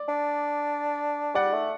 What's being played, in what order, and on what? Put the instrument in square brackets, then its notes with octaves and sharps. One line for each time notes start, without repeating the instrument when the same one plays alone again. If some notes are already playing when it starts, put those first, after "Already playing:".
Already playing: [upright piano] D5
[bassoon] D4
[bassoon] G3 [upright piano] D5 F#5
[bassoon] A3